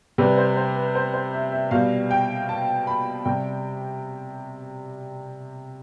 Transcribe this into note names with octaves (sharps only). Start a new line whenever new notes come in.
C3 G3 B4
C5
C5
B4
C5
C5
E5
E5
B2 G3 F5
G5
A5
B5
C3 G3 G5